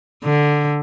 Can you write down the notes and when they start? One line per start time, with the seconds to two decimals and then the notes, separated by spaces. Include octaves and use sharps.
0.24 D3